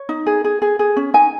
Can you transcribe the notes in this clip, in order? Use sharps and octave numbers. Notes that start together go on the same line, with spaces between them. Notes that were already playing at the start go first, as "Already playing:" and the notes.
Already playing: C#5
D#4
G#4
G#4
G#4
G#4
C#4
D#4 G#5